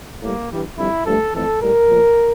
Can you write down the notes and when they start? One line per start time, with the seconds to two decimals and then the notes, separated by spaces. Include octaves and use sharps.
0.21 A2 G3 A#3
0.49 G2 E3 G3
0.76 F2 D3 G3 E4
1.04 G2 F3 A3 A4
1.33 F2 E3 A3 A4
1.61 A2 G3 A#4
1.89 A#2 F3 A3